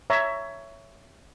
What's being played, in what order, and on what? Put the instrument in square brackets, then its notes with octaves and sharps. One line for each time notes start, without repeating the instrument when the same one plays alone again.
[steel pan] C#5 E5 A#5